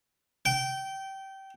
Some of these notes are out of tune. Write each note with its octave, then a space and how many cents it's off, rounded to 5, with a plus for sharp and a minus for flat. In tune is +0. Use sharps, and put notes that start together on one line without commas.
G5 -20